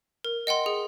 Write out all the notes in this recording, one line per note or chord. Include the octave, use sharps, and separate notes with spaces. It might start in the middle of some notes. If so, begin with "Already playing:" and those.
A#4
D#5 F#5 G5 C6
G#4